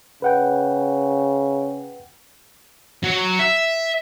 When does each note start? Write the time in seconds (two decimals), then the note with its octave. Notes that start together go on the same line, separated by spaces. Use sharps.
0.22 C#3 B4 F#5 G5
3.04 F#3
3.40 E5